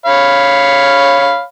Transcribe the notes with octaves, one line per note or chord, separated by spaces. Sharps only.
C#5 F5 B5